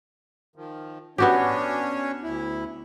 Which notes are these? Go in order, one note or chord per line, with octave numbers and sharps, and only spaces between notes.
D#3 F3
B3 C#4 D4 F#4 G4 C#5
D2 E4